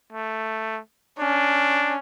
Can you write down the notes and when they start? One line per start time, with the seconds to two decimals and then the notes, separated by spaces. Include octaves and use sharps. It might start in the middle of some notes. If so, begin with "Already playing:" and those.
0.12 A3
1.19 C#4 D4